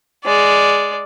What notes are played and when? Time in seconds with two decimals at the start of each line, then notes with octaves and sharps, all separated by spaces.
0.24 G#3 D5